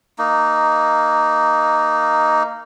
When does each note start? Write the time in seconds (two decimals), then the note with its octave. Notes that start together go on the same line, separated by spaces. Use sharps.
0.19 A#3 D#4